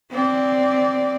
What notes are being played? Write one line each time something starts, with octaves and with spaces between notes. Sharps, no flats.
C4 D5